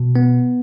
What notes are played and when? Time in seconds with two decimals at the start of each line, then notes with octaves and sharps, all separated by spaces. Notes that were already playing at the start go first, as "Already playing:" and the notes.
Already playing: B2
0.16 B3